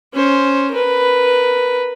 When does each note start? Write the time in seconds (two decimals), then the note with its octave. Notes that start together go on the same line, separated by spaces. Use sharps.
0.14 C#4 C5
0.71 A#4 B4